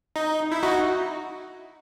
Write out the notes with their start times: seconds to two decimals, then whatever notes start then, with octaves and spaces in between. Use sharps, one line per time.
0.16 D#4
0.52 E4
0.63 D#4 F#4